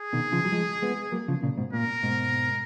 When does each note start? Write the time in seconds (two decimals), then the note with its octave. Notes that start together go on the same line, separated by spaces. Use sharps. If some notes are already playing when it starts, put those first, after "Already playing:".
Already playing: G#4
0.13 B2 D#3
0.32 C#3 F3
0.45 F#3
0.52 F3 G#3
0.82 G#3 B3
1.12 F#3 A#3
1.28 C#3 F3
1.43 A#2 C#3
1.57 G#2 B2
1.73 A#2 A#4
2.03 G#2 B2